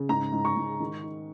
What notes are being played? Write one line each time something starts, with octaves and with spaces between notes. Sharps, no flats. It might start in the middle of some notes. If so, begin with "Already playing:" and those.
Already playing: C#3
G#2 A#5
G#2
C#6
G#2
D#3
D#4